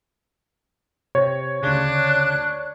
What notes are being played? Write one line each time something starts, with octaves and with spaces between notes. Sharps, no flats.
C3 C#5
D2 C#3 D4 F#6